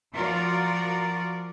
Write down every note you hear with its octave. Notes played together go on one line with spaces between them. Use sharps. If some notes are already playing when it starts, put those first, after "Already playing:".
F3 F4 F#4 A#4 D5